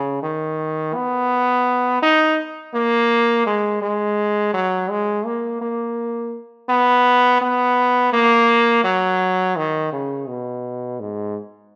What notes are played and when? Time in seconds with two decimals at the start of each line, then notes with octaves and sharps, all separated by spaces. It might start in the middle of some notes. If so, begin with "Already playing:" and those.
Already playing: C#3
0.22 D#3
0.95 B3
2.02 D#4
2.74 A#3
3.46 G#3
3.82 G#3
4.54 F#3
4.90 G#3
5.25 A#3
5.61 A#3
6.69 B3
7.41 B3
8.13 A#3
8.84 F#3
9.56 D#3
9.93 C#3
10.28 B2
11.00 G#2